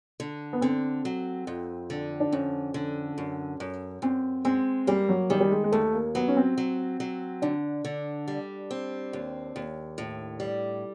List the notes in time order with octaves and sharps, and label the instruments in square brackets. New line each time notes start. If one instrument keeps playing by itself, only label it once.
[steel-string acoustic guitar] D3
[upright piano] B3
[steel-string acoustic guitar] D3 [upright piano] C4
[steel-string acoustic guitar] F#3
F2
D3
[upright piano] D4
[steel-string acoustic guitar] F2 [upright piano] C#4
[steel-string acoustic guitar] D3
F#2
F#2
[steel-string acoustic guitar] F#2 [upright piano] C4
[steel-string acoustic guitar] G#3 [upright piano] C4
[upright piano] G3 [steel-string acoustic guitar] A#3
[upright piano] F#3
[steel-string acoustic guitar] D#3 [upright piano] G3
[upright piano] G3
G#3
G#3
[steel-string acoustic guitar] D#2 [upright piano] A3
[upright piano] A#3
[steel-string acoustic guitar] F#3 [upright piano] B3
[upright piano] C#4
C4
[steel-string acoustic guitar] F#3
F#3
[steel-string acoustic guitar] D3 [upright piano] D4
[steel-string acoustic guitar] D3
G3
C4
D#2
D#2
A2
G3